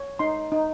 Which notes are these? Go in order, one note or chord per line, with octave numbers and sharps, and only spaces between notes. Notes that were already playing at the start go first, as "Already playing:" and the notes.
Already playing: C#5
D#4 C6
D#4